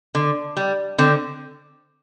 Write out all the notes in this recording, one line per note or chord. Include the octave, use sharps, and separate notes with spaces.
D3
G3
D3 C4